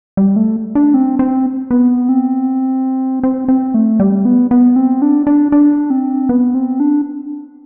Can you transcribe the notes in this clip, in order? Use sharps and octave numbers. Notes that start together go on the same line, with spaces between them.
G3
A3
D4
C4
C4
B3
C4
C4
C4
A3
G3
B3
B3
C4
D4
D4
D4
C4
B3
C4
D4